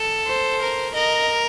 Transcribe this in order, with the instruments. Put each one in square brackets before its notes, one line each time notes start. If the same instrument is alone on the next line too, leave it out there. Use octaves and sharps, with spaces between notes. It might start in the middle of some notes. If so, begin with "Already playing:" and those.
Already playing: [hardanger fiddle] A4
[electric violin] C5
[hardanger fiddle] A#4
[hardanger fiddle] A#4 [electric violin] D#5